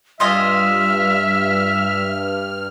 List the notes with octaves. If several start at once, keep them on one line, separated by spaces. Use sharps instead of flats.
G2 G3 F4 D#5 E5 G#5 F6